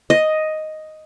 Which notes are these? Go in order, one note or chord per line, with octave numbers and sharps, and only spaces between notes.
D#5